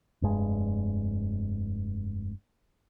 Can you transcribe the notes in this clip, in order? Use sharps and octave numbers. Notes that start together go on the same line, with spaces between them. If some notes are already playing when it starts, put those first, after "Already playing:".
F1 G2 G#3